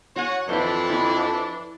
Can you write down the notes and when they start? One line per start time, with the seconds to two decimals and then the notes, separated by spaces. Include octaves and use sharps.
0.16 F#4 C#5 F#5 G#5
0.49 F2 E3 D4 E4 C5
0.90 E4 D5 C#6